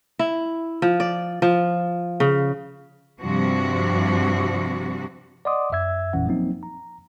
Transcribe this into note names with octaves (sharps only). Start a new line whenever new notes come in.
E4
F3
D5
F3
C#3
G2 C3 F3 F#4
D5 D#5 F#5 C6 D6 D#6
F#2 E5 E6 G#6
G1 F2 A#2 E3 C#4 F#5
F3 F#3 A#3 C4 D#4
A#5